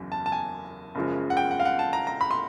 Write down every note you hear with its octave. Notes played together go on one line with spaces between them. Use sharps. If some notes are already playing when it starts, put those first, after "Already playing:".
Already playing: F#1 E2 C#3 F#3
A5
A5
G#5
F#1 F#2 C#3 F3 G#3
F#5
G5
F#5
F5
F#5
A5
A#5
A#5
B5
C6